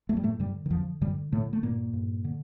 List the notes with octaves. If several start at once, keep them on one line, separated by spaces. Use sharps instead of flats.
G2 A3
G3
A2 A3
G2 D3 G3
D#3
F2 D3 F3
G2 D3 G3
A2 D3 A3
A3
G2 A#2 A#3
G2
D3